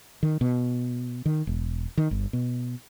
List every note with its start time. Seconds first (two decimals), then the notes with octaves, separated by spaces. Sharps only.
0.23 D#3
0.41 B2
1.26 D#3
1.47 E1
1.97 D#3
2.11 G1
2.33 B2